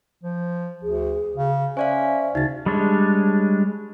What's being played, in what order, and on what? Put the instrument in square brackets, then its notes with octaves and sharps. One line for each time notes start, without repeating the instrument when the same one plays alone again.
[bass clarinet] F3
[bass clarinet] D2 [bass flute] G#4
[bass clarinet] C#3
[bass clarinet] C#4 [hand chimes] C5 D5 F5 [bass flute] E5
[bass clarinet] D2 [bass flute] C#3 [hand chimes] D#4 A6
[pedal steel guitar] G3 G#3 D4 C#5